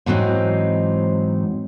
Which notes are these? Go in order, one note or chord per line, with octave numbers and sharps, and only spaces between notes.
G#2 E3 F#3 A#3 C4 D#4